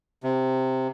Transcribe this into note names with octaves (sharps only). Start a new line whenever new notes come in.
C3